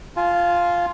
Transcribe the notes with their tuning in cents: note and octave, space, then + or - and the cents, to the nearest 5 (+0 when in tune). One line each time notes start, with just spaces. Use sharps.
F4 +0 G#5 +45